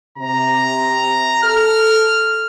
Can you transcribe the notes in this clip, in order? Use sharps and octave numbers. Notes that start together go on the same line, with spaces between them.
C3 A#5
A4 F6